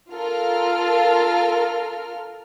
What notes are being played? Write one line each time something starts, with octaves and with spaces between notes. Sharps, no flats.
F4 A4 A#4 F6